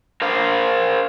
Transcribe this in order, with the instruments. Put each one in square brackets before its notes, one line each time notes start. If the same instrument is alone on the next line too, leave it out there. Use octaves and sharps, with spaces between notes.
[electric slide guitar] A#4 C5 F5